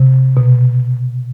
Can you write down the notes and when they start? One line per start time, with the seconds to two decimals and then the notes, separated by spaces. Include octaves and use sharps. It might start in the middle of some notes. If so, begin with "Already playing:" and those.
Already playing: C3
0.37 B2